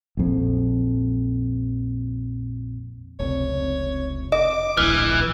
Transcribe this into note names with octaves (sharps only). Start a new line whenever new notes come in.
A#1 F2
F1 C#2 C3 C#5
D#5 D6
D1 A#1 E3 F6